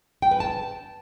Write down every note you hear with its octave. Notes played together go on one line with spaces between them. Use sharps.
G5
B4
A5